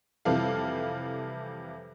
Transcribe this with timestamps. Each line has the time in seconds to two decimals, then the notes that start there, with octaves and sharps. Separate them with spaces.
0.25 F2 C3 E3 G3 A4 F5